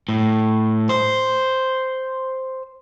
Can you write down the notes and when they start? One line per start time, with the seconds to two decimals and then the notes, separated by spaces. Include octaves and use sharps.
0.09 A2
0.89 C5